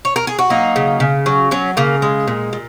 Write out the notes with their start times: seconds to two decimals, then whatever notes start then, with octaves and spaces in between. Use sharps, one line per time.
0.05 C#5
0.16 A#4
0.27 G#4
0.39 F#4
0.50 F#3 A#3 D#4
0.76 C#3
1.00 C#3
1.26 F#3
1.51 F#3 C#4
1.77 C#3 A#3
2.02 G#3
2.28 A#2
2.53 A#2